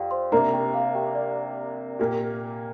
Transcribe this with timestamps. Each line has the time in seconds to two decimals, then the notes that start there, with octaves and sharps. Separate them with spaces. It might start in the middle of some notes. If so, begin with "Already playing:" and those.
Already playing: F2 G4 D5 F5 G5
0.11 C5 C6
0.32 C3 A#3 D4 A#4 A#5
0.53 G4 G5
0.74 F5
0.95 G4 G5
1.15 D5
1.99 A#2 A#3 G4